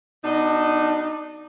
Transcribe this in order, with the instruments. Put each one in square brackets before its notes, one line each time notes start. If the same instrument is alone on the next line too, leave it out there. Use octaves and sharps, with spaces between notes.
[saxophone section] B2 D4 D#4